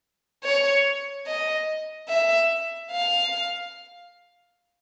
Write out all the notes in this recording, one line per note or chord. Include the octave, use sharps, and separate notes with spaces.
C#5
D#5
E5
F5